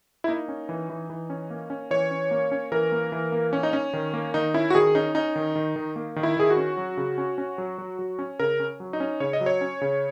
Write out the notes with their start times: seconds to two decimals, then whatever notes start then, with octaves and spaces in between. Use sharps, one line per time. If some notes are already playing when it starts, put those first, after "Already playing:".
0.24 E4
0.28 A#3 D#4
0.48 C#4
0.69 E3
0.90 E3
1.10 E3
1.30 C#4
1.50 A#3
1.70 C#4
1.90 E3 C#5
2.11 C#4
2.31 A#3
2.52 C#4
2.72 E3 A#4
2.92 A#3
3.12 E3
3.32 A#3
3.53 C#4
3.63 D#4
3.73 C#4
3.93 D#3
4.14 A#3
4.34 D#3 D#4
4.54 C#4 E4
4.70 F#4
4.75 D#3 G#4
4.95 C#4 D#4
5.15 C#4 D#4
5.36 D#3
5.56 D#3
5.76 D#3
5.96 A#3
6.16 D#3
6.23 E4
6.37 D#3 G#4
6.50 F#4
6.57 C#4
6.77 F#3
6.97 C#3
7.18 C#4
7.38 C#4
7.58 F#3
7.78 F#3
7.99 F#3
8.19 C#4
8.39 C#3 A#4
8.60 C#4
8.80 F#3
8.93 D#4
9.00 C#4
9.20 C#3 C#5
9.33 D#5
9.41 F#3
9.46 C#5
9.61 C#4
9.81 C#3